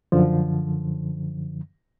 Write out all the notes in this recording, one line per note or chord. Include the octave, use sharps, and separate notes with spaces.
F#2 D3 F3